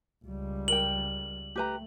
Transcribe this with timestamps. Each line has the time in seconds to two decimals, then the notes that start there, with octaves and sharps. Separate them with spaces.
0.25 C#2 G3
0.68 A#4 G5 F#7
1.56 A3 G4 B4 A#5